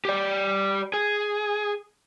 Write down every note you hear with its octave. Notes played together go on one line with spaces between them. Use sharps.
G4 D5
G#4